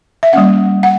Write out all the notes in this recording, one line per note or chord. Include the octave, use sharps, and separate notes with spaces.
E5
G3 A#3 C#4 F#5
F#5